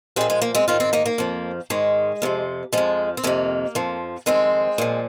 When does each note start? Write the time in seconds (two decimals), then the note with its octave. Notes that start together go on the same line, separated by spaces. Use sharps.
0.16 A#2 F3 G#3 C4
0.30 G#3
0.42 A#3
0.55 G#3 C4
0.68 G#2 D#3 C4 F4
0.80 C4 F4
0.93 A#3 D#4
1.06 A#3
1.18 F2 F3
1.70 G#2 D#3 G#3
2.22 F2 C3 F3
2.73 F2 F3 G#3
3.17 C4
3.24 F2 C3 D#3 A#3
3.75 F2 F3
4.26 F2 D#3 G#3 C4
4.78 A#2 F3